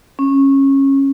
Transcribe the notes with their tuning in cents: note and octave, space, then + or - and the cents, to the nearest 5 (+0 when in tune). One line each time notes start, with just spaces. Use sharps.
C#4 -20